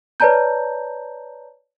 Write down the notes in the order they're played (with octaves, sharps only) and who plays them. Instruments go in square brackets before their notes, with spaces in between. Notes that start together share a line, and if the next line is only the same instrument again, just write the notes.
[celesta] B4 C#5 D5 A5 A#5 G6